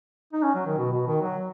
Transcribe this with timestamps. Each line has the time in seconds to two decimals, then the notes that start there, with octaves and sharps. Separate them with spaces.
0.33 D#4
0.43 C#4
0.55 F#3
0.66 D#3
0.77 B2
0.92 B2
1.07 D#3
1.21 F#3